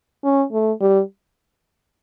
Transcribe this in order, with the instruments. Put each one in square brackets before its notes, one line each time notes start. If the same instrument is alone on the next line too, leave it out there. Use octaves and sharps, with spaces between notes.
[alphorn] C#4
A3
G3